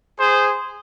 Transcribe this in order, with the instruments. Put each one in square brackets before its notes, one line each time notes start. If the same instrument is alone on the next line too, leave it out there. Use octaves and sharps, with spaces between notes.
[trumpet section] G#4 C5